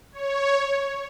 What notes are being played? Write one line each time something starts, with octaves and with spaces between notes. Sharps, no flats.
C#5